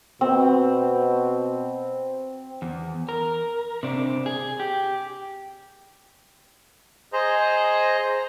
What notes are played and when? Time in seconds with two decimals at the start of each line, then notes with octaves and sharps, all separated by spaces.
0.21 B2 C4
2.62 E2
3.09 A#4
3.83 C3 D4
4.26 G#4
4.60 G4
7.13 G#4 C5 D#5 A#5